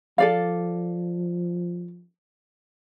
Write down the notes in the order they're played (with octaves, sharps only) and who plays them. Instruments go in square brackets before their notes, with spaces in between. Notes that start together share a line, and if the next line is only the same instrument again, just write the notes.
[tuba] F3 [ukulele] A4 D5 F5